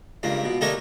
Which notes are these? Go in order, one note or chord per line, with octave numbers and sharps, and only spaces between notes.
C#2 G2 A#3
B2
D3 A3 D#4 G4 A#4 C#5